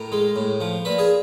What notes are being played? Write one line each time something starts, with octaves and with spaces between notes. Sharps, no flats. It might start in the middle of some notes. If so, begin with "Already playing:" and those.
Already playing: A2 A#4
G#3
A2
F3
A#2 B4
G#4